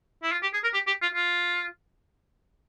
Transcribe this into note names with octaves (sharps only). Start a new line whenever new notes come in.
E4
F4
G4
G#4
A#4
G4
G4
F4
F4